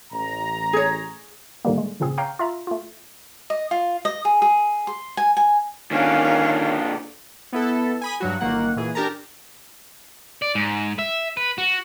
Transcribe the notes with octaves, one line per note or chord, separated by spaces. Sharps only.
A1 A#5
G#4 C#5
A2 D3 D#3 G3 A#3
G#3
G#1 A#2 C#3 C4 G#4
C#5 F5 G5 A#5 D6 G6
F4 E5 A#5
A3 F4
D#5
F4
D#5
G#4
G#4
C6
G#5
G#5
A#2 D3 D#3 C#4 F5
B3 E4 A4
G#5 B5 D#6
G2 F#3 F#4
G1 D#3 A#3 F#5
A#2 E3 G#4
D4 G4 A#4 A5 A#5
D5
G#2
E5
B4
F#4